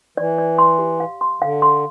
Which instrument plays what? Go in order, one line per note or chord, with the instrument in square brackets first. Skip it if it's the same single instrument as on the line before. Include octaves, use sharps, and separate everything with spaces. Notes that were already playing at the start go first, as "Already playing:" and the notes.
[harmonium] E3 [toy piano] D5
[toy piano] D5
C6
G4
F5
C6
[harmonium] D3 [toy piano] F5
[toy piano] C6